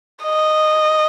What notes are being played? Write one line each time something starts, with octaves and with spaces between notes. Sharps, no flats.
D#5